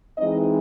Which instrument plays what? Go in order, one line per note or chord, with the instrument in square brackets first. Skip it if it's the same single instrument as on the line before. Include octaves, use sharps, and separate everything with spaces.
[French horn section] E3 G#3 C4 D#4 D#5